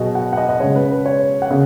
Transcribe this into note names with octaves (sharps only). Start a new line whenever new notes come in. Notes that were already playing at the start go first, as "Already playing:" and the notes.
Already playing: B2 F#3 F#4 G#4 D#5
F#5
F#5
D#5
D#5
C#3 G#3 C#5
B4
B4
C#5
F#5
C#3